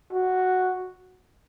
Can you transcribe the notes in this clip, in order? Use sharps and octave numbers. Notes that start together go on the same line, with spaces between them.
F#4